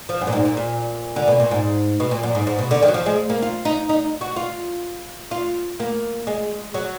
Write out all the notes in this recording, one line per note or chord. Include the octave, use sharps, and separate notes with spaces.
F3
F#2
A#2
G#2
A#2
A#2
D3
B2
A#2
G#2
B2
A#2
F#2
G#2
G#2
B2
D3
D#3
F#3
F3
G#3
A#3
F4
D#4
D#4
F#4
F4
F4
A#3
G#3
F#3